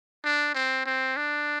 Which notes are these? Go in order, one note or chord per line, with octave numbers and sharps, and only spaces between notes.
D4
C4
C4
D4